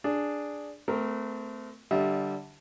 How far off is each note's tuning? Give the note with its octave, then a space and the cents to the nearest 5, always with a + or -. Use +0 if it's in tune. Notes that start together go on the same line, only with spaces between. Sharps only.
D4 +0 G#4 +0
A3 +0 C4 -35 A#4 +0
D3 +0 G3 -15 E5 -35